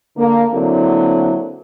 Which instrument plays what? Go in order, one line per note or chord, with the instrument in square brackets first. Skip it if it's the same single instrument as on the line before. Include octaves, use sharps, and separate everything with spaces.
[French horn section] D3 A#3
D3 F#3 A#3 C4 E4